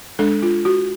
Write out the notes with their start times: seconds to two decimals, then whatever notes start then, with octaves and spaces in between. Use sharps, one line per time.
0.19 G#3 D4 A4
0.42 F4
0.65 F#4